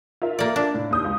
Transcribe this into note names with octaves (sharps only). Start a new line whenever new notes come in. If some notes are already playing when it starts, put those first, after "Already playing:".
F4 A#4 E5
A#3 D5
D4
A2
D#2 D#6 G6
C#2